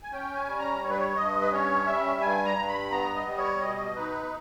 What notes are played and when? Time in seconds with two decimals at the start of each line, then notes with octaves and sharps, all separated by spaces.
0.03 G#5
0.12 C#4 G5
0.35 G#5
0.47 G3
0.59 A#5
0.82 G2 C#5
0.90 B4
0.97 C#5
1.16 G2 D#5
1.42 B4
1.52 C#4 C#5
1.87 G3 E5
2.22 G2 G#5
2.45 A#5
2.57 G2
2.68 B5
2.91 B3 A#5
3.15 D#5
3.27 G3
3.38 C#5
3.61 B2 D#5
3.96 D#4 B4